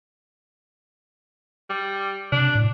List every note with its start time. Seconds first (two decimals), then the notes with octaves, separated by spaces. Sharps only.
1.70 G3
2.32 C3 D4
2.55 A2